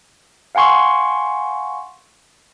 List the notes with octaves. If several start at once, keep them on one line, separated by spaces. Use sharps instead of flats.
F5 F#5 G#5 C6 C#6